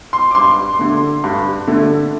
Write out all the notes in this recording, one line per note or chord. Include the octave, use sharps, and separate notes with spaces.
C6
D6
G2 C6
D3 A3
G2
D3 A3